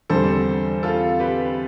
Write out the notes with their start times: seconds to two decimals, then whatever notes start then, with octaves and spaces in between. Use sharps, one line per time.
0.10 E2 D3 G3 C4 A4 C5
0.83 F4 A4
1.20 G4 B4